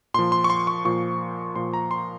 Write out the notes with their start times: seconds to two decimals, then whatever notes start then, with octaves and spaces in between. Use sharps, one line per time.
0.14 A#2 F3 C6
0.32 C6
0.44 C#6
0.50 C6
0.67 C#6
0.85 A#2 F3 C#6
1.56 A#2 F3 C6
1.74 A#5
1.91 C6